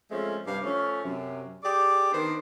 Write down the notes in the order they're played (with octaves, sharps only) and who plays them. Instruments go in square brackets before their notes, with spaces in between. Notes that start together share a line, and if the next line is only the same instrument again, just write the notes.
[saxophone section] F3 G#3 A3 C4 C#4
G2 C3 D5 F5
F3 A3 C#4
F#2 C3
G4 G#4 D5
D#3 B3 D4 A#4 C5